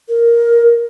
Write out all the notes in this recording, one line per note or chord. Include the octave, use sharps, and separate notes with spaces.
A#4